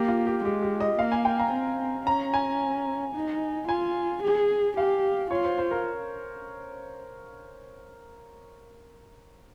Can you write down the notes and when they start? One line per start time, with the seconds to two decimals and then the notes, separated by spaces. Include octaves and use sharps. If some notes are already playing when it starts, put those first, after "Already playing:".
Already playing: A#3 G4
0.08 F4
0.27 G4
0.45 G#3 G4
0.63 G4
0.80 D#5
0.98 A#3 F5
1.12 G#5
1.25 G5
1.39 A#5
1.53 C4
2.07 C#4 A#5
2.34 G#5
3.15 D#4
3.69 F4 G#5
4.23 G#4
4.77 G4 F5
5.31 F4 C#5
5.44 C5
5.58 C5
5.71 A#4